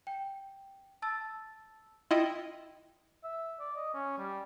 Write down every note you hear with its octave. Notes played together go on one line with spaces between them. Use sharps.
G5
A5 E6 A6
E4 F4 D#5 G5
E5
D5
D#5
C#4
G3